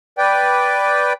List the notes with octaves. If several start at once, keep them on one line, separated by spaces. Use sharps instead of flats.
B4 D5 G5